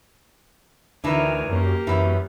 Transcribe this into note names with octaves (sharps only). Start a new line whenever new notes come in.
D2 D#3 E3 D4 A#4 G#5
F#2 A#3 G4
F#2 E3 B3